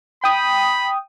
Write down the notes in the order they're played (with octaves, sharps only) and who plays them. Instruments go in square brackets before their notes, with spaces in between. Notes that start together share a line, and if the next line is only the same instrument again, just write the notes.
[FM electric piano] G5 D#6 [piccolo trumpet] B5